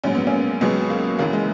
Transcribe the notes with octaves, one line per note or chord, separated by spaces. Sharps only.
A#1 G#2 F#3 C#4
B3
A#3 C#4
C#2 B2 F#3 G#3 B3
A#3
F#1 F#2 E3 A#3
G#3